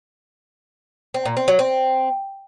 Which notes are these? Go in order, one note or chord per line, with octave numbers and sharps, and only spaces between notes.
C4
A#2
C4
F#3
C4